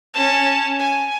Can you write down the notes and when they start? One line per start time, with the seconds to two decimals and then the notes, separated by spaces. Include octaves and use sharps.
0.14 C#4 A5
0.79 G#5